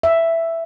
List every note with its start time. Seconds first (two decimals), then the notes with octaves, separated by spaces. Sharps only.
0.03 E5